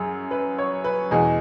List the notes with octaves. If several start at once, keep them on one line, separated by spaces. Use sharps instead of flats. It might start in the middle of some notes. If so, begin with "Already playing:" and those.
Already playing: F#2 F#3 G#4
B4
C#5
B4
E2 B2 G#3 G#4